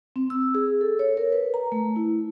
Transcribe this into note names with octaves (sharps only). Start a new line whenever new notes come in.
C4
E6
G#4
A4
C#5
A#4
B4
A#5
A3
E4